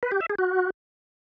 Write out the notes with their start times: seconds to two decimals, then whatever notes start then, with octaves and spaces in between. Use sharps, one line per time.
0.03 B4
0.12 G4
0.21 E5
0.30 G#4
0.39 F#4